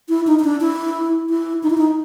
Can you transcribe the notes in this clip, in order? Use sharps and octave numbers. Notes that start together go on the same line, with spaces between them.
E4
D#4
D#4
D4
E4
E4
D#4
E4
D#4